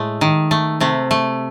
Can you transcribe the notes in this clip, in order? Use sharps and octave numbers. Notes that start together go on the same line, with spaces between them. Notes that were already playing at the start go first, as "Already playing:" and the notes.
Already playing: A2 G#3 A3
D#3
A3
C3 A3
A3